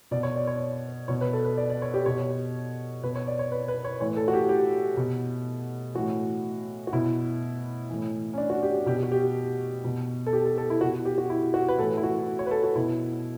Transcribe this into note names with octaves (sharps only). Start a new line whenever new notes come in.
B2 D5
C#5
D5
C#5
B2 C#5
B4
A4
B4
D5
D5
C#5
G4
B2 C#5
B2 B4
C#5
D5
C#5
B4
B4
C#5
A2 E3 C#5
A4
F#4
G4
G4
B2
A2 E3 F#4
F#4
B2 E4
A2 E3
C#4
D4
F#4
G4
B2 G4
F#4
G4
B2
A4
G4
A4
A4
E4
B2 F#4
G4
F#4
E4
F#4
B4
A2 E3 A4
E4
F#4
C#5
B4
A4
F#4
B2 E4